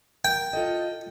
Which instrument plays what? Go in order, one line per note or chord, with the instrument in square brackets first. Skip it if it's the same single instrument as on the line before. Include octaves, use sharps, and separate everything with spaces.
[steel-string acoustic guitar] A#4 [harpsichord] G5
[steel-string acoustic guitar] F4 A4 D#5